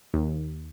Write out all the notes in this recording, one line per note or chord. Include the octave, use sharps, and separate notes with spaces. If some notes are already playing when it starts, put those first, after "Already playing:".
D#2